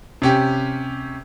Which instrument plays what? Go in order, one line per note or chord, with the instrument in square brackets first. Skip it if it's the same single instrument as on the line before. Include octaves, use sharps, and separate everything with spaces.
[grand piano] C3 C#4 G4